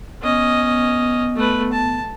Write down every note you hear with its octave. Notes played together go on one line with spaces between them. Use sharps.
B3 C#4 D#5
A3 B4
A5